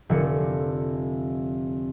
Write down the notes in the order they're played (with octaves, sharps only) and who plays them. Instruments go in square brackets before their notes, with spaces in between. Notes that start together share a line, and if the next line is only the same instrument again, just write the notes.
[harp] F1 D3 C#7